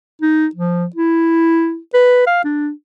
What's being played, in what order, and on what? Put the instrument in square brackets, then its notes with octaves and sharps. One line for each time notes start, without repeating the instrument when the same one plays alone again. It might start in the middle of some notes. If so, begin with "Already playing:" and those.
[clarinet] D#4
F3
E4
B4
F5
D4